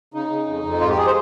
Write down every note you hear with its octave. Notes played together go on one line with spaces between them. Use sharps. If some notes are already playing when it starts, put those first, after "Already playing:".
C#3 D#4
C#3
F2
F2
G#2 F4
G4
G#4
C5